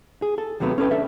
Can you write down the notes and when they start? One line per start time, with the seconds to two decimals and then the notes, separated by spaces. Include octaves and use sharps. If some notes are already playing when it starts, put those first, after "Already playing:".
0.22 G#4
0.38 A4
0.60 D#2 C3 F#3 A3 B3
0.78 C#4 A4 B4 G5
0.91 D4 A4 E5